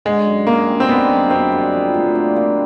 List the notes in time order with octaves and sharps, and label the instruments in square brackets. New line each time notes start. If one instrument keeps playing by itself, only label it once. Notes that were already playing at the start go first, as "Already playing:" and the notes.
[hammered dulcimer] D3 [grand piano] G#3
[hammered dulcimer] F#2
[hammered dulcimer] F#2 [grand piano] A#3
[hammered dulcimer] G3
[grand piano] C4
[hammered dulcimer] D3 [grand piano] B3
[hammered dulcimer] F#2
[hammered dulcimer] F#2 [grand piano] C4
[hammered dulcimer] G3
F3
A2
D4
A#3